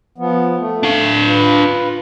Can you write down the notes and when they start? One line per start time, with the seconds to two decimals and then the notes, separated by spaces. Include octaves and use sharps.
0.18 F3 B3
0.60 A3
0.83 D4 F5
1.27 F4 B4